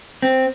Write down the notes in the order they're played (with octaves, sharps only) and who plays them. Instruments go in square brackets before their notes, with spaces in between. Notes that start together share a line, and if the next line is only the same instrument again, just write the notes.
[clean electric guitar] C4